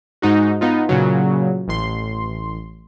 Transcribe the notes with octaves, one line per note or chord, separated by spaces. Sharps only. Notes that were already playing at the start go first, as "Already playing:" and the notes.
G#2 D#4 F#4
B3 D#4 F4
A#2 C#3 F#3
A1 C6